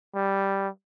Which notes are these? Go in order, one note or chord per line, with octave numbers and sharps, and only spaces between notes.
G3